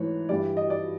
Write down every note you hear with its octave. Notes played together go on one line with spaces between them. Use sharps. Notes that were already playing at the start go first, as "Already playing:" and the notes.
Already playing: G#2 E3 A3 C#5
G2 E3 G3 D5
D#5
D5